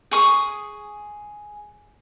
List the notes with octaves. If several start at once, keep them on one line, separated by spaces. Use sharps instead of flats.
G#4 C#6 D#6